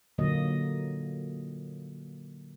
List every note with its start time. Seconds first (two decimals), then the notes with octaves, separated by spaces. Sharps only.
0.18 A#2 D3 F#3 A#3 D#5